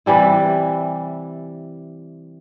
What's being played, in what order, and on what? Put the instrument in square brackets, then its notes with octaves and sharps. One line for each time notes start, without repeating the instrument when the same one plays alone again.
[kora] C3 E3 G3 E4